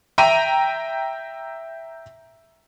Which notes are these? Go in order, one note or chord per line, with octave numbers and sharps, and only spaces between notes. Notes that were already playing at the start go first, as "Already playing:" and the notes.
E5 G5 A#5 D#7